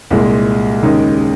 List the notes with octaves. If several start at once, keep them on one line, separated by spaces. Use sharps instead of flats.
C2 A#2 G#3
D#2 C#3 G#3 D#4